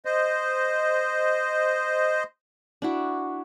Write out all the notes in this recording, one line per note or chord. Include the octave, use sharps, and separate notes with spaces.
C5 D#5
D4 E4 F#4